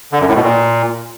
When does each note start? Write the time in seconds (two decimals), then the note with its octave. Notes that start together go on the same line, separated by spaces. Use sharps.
0.12 D3
0.20 F#2
0.28 A2
0.36 B2
0.44 A#2